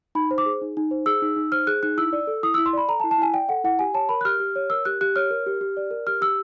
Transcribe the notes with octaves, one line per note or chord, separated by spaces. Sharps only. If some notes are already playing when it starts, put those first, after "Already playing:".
D#4 B5
C5
D6
G#4
D#4
D#4
C5
G#4 E6
D#4
D#4
C5 F6
G#4 F#6
D#4 F#6
E4 E6
D5
A4
E4 D#6
E4 E6
C6
D5 B5
A4 A#5
A5
E4
A5
E4 G#5
D5 G5
A4 F#5
E4 F#5
G4 G#5
C#5 A5
A#4 B5
F#6
G4 F6
G4
C#5
A#4 E6
G4 F#6
G4 F#6
C#5 F6
A#4
G4
G4
D5
A#4
G4 F6
G4 E6